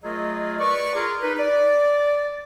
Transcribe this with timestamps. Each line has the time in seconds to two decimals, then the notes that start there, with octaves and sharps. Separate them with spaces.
0.04 F#3 A3 F4 G#4 A#4 D#5
0.59 B4 D5 C#6
0.95 F4 G#4 A#4
1.22 D#4 B4
1.38 D5